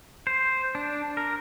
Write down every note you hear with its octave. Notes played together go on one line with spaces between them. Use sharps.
C5
D4
A#4